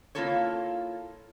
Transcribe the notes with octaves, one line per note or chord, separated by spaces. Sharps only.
A#3 C4 E4 F4 A4 C#5